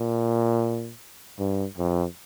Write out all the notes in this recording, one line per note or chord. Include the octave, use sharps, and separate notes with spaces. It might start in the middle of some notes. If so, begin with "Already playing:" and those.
Already playing: A#2
G2
F2